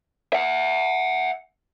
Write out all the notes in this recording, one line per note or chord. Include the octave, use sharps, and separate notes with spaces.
E5 F#5